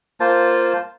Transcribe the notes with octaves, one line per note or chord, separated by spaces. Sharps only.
A#3 F4 C5 A5